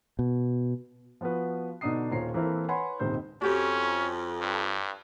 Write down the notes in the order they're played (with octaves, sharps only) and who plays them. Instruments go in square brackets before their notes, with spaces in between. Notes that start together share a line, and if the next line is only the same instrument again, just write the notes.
[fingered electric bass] B2
[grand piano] F3 B3 F4 F#4 B4
B2 D3 D4 D#4 D#6 C7
D#1 F4 C5 C#5 A#5 C7
E3 A#3 C4 E4 A4 A#4
B4 C#5 F#5 G#5 B5 C6
D#1 G#2 C3 D#3 C5 G6
[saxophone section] F2 [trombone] C#4 [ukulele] F#4 G4
[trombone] G2